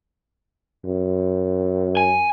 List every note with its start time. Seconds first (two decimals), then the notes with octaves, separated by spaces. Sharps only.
0.85 F#2
1.97 G#5